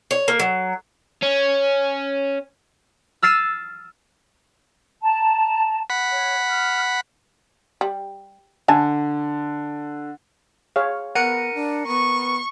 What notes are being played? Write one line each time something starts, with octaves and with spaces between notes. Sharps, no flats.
C#5
A#3
F#3
C#4
E6 F6 A6 C7 D#7 E7
A5 A#5
F#5 B5
C#5
F6
G3
D3 A4 G#5 A5
G#4 C#5 F5
B3 A#4 F#5 C#7 D#7
D4
B3 C#6